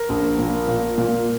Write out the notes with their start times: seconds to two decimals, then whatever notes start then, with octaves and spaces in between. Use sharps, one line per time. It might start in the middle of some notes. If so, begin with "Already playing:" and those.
Already playing: A#4
0.09 A#1
0.39 A#2
0.68 A#2
0.98 A#2